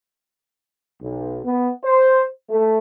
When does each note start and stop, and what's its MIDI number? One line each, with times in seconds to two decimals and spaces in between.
1.01 1.39 35
1.45 1.69 59
1.83 2.23 72
2.50 2.78 57